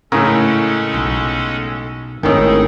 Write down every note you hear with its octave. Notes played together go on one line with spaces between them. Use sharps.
A2 C#3 G#3 C#4 A4 A#4 A#5
B1
G#1 A2 D#3 C#4 G#4 A4